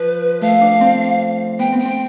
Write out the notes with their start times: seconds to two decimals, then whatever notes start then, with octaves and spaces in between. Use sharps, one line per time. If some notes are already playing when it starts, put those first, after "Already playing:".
Already playing: F3 B4
0.41 A3 F5
0.61 D4
0.81 C4
1.59 B3 G5
1.72 C4
1.79 G5
1.85 C4